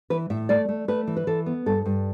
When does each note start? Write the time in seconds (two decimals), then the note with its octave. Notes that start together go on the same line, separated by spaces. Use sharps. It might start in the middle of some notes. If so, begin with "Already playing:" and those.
0.10 E3 B4
0.30 A2 E5
0.49 A3 D5
0.69 A3
0.88 A3 B4
1.07 E3
1.17 B4
1.27 E3 A4
1.46 B3
1.66 G2 A4
1.86 G2